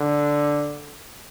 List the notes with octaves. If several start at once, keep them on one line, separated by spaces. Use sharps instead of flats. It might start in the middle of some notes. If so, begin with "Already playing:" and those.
Already playing: D3